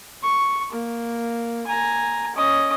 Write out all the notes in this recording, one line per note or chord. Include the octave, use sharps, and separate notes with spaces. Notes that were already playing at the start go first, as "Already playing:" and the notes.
C#6
A#3
G#5 A#5
C#4 D#5